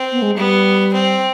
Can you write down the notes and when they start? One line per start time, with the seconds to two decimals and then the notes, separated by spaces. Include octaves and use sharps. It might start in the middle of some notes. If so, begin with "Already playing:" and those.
Already playing: C4
0.12 B3
0.22 G#3
0.36 G3 B3
0.93 C4